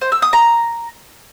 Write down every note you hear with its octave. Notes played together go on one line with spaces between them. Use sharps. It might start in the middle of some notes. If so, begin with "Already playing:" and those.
C5
E6
D#6
A#5